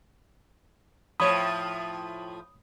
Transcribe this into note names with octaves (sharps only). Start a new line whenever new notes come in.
A2 F3 C#5 B5 D#6